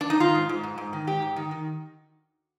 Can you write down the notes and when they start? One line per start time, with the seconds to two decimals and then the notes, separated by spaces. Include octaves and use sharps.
0.01 D4
0.10 D#4
0.20 D#3 F4
0.35 G#2
0.49 G#2
0.63 G#2
0.78 G#2
0.93 D#3
1.07 G#2 G4
1.22 G#2
1.36 D#3
1.51 D#3